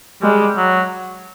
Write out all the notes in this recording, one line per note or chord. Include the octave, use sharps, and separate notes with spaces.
G3 G#3
F#3